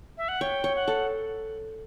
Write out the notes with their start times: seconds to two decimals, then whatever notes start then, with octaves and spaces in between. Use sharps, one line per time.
0.17 E5
0.28 F#5
0.41 C#5 G5
0.64 C#5
0.76 F#5
0.88 A4